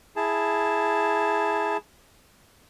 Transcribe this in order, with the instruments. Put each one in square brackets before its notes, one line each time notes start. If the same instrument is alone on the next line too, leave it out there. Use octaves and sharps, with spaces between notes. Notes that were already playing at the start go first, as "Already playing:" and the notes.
[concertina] E4 G#4 A5